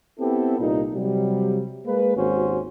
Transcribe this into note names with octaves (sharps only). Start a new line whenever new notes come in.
B3 C4 E4 G4 A4
C2 A#2 D#4
C3 F#3 G3
G#3 A#3 B4
G#1 D#2 C#4 F#4 C5